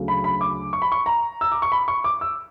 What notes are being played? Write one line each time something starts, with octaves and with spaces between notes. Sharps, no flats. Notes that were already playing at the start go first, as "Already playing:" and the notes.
Already playing: D2 C#3 F#3
B5
B5
D6
C#6
B5
C#6
A#5
E6
D6
C#6
B5
C#6
D6
E6